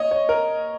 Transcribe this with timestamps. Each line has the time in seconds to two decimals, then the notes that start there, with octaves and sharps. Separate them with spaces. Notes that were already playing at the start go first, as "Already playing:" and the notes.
Already playing: C#5 D#5
0.11 C#5
0.29 A#4